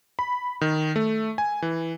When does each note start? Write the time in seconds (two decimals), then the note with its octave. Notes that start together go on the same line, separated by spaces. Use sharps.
0.19 B5
0.61 D#3
0.96 A3
1.38 G#5
1.62 E3